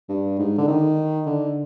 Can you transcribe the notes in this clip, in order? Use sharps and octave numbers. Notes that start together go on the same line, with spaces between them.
G2
G#2
D3
D#3
D3